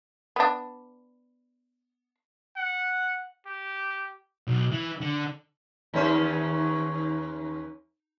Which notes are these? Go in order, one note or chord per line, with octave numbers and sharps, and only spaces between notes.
B3 D4
F#5
G4
B1
E3
D3
D#2 C#4 C5